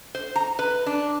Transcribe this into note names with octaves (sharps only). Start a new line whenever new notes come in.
C5
A#5
B4
D4